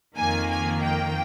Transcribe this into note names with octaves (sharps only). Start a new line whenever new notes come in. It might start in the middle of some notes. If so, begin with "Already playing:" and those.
F2 D#3 A#3 G#5
G#5
G5